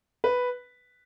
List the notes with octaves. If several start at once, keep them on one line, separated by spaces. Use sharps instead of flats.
B4